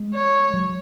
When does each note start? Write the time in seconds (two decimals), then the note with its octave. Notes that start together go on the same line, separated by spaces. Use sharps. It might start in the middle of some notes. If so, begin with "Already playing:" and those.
Already playing: G#3
0.14 C#5
0.54 F#3